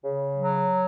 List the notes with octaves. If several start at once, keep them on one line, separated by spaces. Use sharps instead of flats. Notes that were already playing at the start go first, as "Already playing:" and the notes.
C#3
F#3